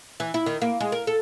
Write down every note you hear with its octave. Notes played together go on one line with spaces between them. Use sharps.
E3
E4
D#3
A#3
G#3
A#4
A4